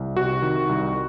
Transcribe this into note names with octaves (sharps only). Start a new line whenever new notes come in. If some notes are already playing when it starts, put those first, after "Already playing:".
Already playing: C2
C3 F#4
D#3
C2